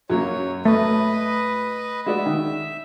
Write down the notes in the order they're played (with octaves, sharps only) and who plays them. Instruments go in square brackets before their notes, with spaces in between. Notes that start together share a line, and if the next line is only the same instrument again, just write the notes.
[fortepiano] F#2 F#3 A#3 [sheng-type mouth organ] C#5
[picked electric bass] A3 [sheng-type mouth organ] B4 D#5
[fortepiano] G#3 F#4 D5 [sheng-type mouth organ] E5
[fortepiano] D#3